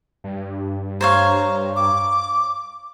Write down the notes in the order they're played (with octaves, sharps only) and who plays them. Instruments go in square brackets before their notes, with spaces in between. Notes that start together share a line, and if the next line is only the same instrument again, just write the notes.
[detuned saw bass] G2
[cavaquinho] C5 C#5 F5 [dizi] A#5
[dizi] D6